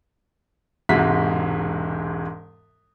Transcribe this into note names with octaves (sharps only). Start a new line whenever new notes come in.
E1 G#2 C3 G#3 F#4 B6